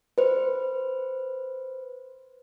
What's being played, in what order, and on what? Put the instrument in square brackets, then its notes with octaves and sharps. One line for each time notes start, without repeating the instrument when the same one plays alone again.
[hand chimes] B4 C5